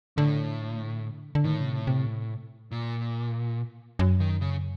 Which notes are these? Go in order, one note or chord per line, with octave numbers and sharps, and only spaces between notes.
A2 D3
D3
A2 D#3
C#3
C3
C3
A#2
F#2
D#3
C#3